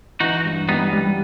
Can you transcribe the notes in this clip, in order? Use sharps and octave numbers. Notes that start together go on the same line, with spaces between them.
E3 D#4 F#4
G2
G3 B3 D#4
G3